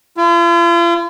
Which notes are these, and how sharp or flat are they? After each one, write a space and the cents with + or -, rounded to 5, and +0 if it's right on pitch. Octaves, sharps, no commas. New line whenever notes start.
F4 -45